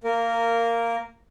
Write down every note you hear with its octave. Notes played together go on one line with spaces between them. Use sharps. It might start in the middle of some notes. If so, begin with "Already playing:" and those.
A#3 A#4